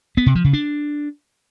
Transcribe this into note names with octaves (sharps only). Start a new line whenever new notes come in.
B3
C3
F3
C#3
D4